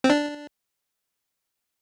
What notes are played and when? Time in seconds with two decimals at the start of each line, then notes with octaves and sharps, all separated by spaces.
0.04 C4
0.10 D4